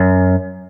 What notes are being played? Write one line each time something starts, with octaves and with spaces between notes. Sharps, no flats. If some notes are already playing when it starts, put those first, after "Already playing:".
Already playing: F#2